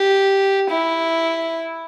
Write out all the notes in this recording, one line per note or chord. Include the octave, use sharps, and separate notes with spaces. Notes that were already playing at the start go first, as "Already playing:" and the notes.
Already playing: G4
E4